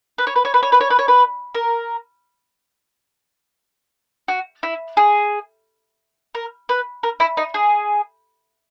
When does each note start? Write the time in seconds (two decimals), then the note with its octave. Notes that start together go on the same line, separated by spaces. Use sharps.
0.18 B4
0.27 C#5
0.36 B4
0.45 C#5
0.54 B4
0.63 C#5
0.72 B4
0.81 C#5
0.90 B4
0.99 C#5
1.08 B4
1.55 A#4
4.28 F#4
4.63 E4
4.97 G#4
6.35 A#4
6.69 B4
7.03 A#4
7.20 E4
7.37 D#4
7.54 G#4